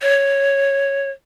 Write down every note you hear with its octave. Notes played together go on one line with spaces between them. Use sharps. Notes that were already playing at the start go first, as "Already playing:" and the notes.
C#5